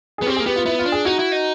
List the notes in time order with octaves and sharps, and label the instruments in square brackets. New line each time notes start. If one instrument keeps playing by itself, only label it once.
[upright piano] G#4
[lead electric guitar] B3
[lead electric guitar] C4 [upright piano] G4
[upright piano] G#4
[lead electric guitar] A#3
[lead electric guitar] B3 [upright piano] G4
[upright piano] F4
[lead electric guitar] B3 [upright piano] E4
[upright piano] F4
[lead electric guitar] D4
[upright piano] G#4
[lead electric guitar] D#4 [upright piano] F#4
[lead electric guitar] E4
D#4